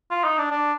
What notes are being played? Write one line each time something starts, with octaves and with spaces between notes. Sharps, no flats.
F4
D#4
D4
D4